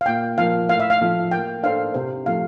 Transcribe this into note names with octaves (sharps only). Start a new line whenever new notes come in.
F5
A#2 G5
F3 A#3 F5
A2 F5
E5
F5
F3 A3
A#3 G5
D4 A4 C5 F5
C3 C5
F3 A3 F5